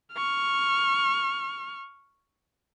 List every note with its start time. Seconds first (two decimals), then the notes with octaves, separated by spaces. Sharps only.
0.14 C#6 F6